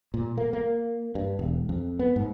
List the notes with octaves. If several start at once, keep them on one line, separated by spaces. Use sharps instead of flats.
A#2
A#3
A#3
G2
E1
F2
B3
G#2